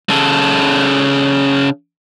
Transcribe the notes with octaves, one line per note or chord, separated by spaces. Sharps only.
C#3 A4